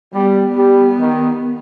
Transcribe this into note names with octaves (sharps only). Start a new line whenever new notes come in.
G3 B3
G3
D#3